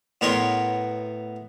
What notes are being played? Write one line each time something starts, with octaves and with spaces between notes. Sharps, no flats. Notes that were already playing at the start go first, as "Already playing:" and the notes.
A2 B3 A#4 C#5 C6